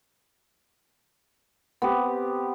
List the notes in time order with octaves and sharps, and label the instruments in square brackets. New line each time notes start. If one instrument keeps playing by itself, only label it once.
[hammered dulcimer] B3 C4 G4